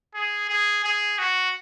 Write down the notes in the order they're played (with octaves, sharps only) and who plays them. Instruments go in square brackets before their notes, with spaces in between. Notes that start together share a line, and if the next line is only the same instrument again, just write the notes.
[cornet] G#4
G#4
G#4
F#4